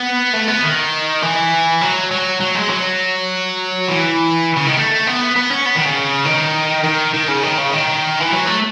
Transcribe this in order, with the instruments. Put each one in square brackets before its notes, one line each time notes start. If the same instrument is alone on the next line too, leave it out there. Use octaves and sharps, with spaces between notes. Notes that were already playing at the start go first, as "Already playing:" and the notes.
Already playing: [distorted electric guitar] B3
A3
B3
D#3
E3
F#3
F#3
F#3
G#3
F#3
E3
C#3
D#3
A3
B3
B3
C#4
B3
D#3
C#3
D#3
D#3
D#3
C#3
D#3
C#3
D#3
E3
F#3
A3